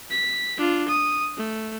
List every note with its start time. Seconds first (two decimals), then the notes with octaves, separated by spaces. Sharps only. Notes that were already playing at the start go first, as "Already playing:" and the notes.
0.11 B6
0.58 D4 F4
0.88 D#6
1.37 A3